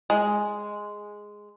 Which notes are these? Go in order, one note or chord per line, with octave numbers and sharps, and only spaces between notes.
G#3